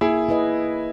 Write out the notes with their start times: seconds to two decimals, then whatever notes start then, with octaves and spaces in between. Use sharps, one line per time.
0.01 A#3 E4 G#4
0.29 E4 B4 D#5